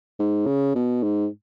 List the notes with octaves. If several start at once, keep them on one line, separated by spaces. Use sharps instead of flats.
G#2
C#3
B2
G#2